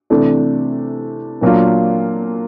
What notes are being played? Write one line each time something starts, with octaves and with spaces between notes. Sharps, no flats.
C3 E3 A3 D4
A#2 F#3 A#3 D4 F4